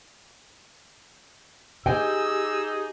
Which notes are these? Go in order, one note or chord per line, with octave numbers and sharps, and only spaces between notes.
D#4 G4 G#4 G5 G#5 E6